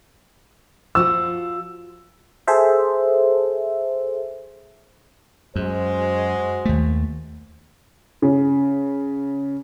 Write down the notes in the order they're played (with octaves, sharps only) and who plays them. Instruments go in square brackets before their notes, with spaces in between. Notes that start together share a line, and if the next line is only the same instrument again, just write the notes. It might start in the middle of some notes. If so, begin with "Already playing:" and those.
[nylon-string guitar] F3 F4 F#4 [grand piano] E6
[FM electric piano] G#4 A4 C5 E5
[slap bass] F#2 [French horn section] G#3 F#4 C5
[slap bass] D#2 A3
[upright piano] C#3